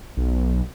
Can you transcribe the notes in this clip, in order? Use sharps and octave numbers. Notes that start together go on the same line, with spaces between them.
B1